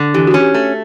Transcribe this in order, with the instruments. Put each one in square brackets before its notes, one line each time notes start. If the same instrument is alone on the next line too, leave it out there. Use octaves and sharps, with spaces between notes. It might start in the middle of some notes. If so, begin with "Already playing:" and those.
Already playing: [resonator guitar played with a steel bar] D3
[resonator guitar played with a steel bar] E3 [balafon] G4
[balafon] F#4
[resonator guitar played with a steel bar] C#4
[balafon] G4
[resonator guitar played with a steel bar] A3